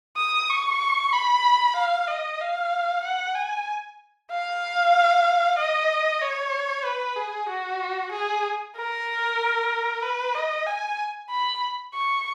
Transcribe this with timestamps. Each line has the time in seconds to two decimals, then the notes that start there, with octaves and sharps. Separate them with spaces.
0.17 D#6
0.50 C#6
1.13 B5
1.76 F5
2.08 D#5
2.40 F5
3.03 F#5
3.35 G#5
4.31 F5
5.58 D#5
6.21 C#5
6.84 B4
7.16 G#4
7.49 F#4
8.12 G#4
8.76 A#4
10.02 B4
10.35 D#5
10.66 G#5
11.30 B5
11.94 C#6